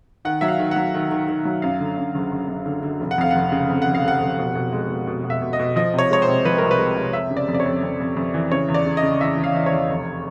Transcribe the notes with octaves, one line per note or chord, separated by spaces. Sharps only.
D#3 F#5
F#3 E5
F5
D#3
F#3 F#5
D#3
D#3
D#3
F#3
F#2 F5
D3
F#2
F#1
F#1
F#2
D3
D3
F1
F#5
F2 F5
F1 F#5
C#3
F2
F#5
F1
F5
F1 F#5
F1
B2
B2
G#3
B2
B2
B2
E5
B2
D#5
B2
F3 D#5
C3 C#5
G#3 C#5
C5
C3
F3 B4
C2 A#4
B4
G#3
C3
F2 E5
C#3
D5
F2
D5
C#5
F2
F2
F2
F2
E3
C#3 C#5
E2
D5
C#3
D#5
C#3
E3 E5
E2
F5
E3
C#5
E2
F1